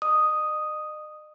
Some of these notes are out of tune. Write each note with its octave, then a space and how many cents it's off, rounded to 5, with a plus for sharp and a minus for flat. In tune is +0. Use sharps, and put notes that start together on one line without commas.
D#5 -40 D#6 +0